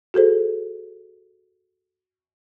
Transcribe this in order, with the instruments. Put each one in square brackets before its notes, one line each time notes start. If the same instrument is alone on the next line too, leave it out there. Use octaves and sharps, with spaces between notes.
[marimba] F#4 G#4 A4 C5